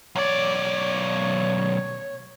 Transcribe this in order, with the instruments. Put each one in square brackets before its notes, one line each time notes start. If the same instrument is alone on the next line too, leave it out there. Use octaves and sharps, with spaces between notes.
[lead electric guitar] B1 D5 [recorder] C#5